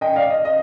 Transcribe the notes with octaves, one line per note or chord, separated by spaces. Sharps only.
D#5 G5
D5 F5
D#5
D#5